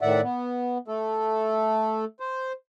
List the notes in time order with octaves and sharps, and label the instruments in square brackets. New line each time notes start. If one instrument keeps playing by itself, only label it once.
[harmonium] A2 D#3 D5 E5 F#5
B3
A3 A4
C5